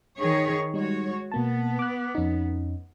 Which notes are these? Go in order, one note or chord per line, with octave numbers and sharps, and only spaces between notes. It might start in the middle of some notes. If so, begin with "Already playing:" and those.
D#3 G#4 C#5
G3 G#3 D#4 F#4 C#5
B2 A#3 B3 A5
D6 F#6
F2 C#4 D#4